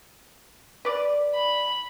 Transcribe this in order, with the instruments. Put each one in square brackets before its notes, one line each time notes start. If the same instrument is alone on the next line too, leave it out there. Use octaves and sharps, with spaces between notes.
[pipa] B4 D5
[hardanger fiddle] B5